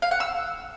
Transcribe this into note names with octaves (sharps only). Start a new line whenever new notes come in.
F5
F#5
E6